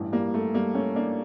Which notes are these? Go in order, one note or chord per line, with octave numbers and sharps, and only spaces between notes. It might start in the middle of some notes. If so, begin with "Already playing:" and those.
Already playing: A1 G2 E3
G3 A#3
A3
G3 A#3
A3 C#4
A#3 D4